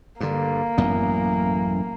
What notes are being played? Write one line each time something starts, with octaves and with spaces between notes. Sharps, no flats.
G2 D3 A#3
A1 F#2 B3